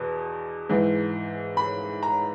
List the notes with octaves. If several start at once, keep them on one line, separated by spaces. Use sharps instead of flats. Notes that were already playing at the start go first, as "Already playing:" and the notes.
Already playing: E2 B2
G#2 E3
B5
A#5